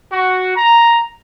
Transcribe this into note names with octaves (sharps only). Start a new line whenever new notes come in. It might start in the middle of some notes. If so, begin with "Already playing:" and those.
F#4
A#5